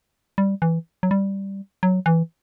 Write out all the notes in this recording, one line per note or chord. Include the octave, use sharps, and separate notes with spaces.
G3
E3
F#3
G3
F#3
E3